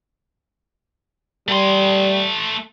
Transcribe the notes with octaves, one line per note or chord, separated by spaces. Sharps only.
G3 A3 C6